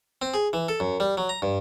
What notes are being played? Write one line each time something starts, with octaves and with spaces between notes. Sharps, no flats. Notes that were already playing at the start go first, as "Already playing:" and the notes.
C4
G#4
E3
A4
F#2
G3
F#3
A#5
G2